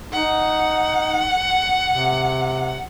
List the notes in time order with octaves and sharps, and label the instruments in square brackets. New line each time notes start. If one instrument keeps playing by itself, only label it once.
[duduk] D#4 [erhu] F#5
[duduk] C3